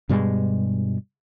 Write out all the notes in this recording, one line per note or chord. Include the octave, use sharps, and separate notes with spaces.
G2 B2 G3 G#3